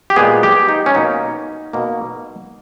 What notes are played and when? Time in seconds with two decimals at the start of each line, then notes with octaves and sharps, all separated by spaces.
0.10 G4
0.16 A#2 G#3 B3 G#4
0.43 G4
0.69 D#4
0.86 C#4
0.94 B2 A#3 D#4
1.73 B2 A#3